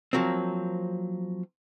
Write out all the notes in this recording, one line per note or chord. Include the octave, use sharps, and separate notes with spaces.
F3 F#3 A#3 C4